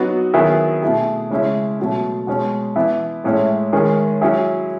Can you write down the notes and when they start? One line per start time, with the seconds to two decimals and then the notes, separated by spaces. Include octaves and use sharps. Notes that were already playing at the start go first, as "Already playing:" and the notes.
Already playing: F#3 B3 D#4 F#4
0.34 D#3 F#3 B3 E4 G#4
0.82 B2 A3 E4 G#4
1.30 C#3 G#3 C#4 E4
1.79 B2 F#3 A3
2.27 B2 G#3 C#4
2.76 E3 B3 E4
3.24 A2 G#3 C#4 E4
3.73 D#3 G#3 C#4 G#4
4.21 F#3 C#4 E4 G#4